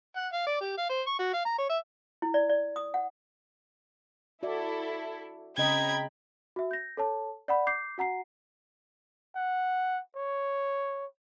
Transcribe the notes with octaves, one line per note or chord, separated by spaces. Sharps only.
F#5
F5
D5
G4
F5
C5
C#6
F#4
F5
A#5
C#5
E5
E4
D5
D5
D#6
F#5
E4 F#4 A4 D5 E5
C#3 C4 D#5 G5 A#5 B5 G#6
F#4 E5
G6 A#6
A4 C#5 A5
D5 F#5 B5
D6 G6 C7
F#4 F#5 A#5 C7
F#5
C#5